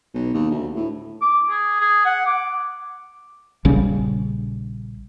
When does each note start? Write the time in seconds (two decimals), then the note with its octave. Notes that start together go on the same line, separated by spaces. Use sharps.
0.14 B1
0.34 D#2
0.51 D2
0.76 A2
1.21 D6
1.50 G#4
1.80 G#4
2.05 F#5
2.26 D6
3.65 A#1 C#3 G3 C#4